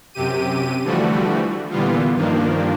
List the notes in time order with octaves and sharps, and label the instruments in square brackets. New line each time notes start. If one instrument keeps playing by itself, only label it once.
[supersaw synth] F#2 C3 G4 D#7
D3 E3 F3 G3 A3 F#4
A#2 D3 E3 G3 B3 F4
G2 D#3 F3 A#3 D4